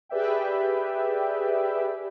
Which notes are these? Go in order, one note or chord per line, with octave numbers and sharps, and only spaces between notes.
G4 G#4 B4 D5 E5 G5